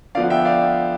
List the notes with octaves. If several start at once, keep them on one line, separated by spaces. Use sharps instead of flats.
D3 F3 B3 D5 F5
E5 G5
D5 F5